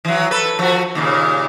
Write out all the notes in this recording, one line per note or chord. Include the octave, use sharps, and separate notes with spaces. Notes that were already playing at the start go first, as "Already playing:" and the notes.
E3 F#3
A4 B4
F3 F#4
D#2 A#2 C#3